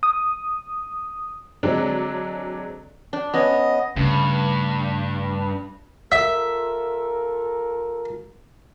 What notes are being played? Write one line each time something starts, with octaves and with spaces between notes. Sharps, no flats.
D#6
D3 F#3 G#3 C4 D4
D4
B3 C#4 D#5
G2 C#3 A3
F4 A4 A#4 E5